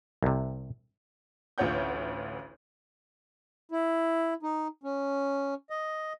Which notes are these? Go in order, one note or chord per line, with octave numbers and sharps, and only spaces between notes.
C2 C3
A1 D2 F4 C#5 F#5 G6
E4
D#4
C#4
D#5